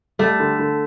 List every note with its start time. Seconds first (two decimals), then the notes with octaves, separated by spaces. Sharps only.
0.19 G3 A3
0.40 D3
0.59 D3